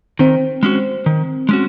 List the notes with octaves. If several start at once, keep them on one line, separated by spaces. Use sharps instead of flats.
D#3 C4
G#3 C#4 F#4
D#3
G#3 C#4 F#4